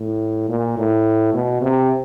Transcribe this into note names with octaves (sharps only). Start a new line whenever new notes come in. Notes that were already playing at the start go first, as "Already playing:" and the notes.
Already playing: A2
A#2
A2
B2
C3